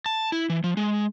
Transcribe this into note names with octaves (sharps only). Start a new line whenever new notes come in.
A5
E4
E3
F3
G#3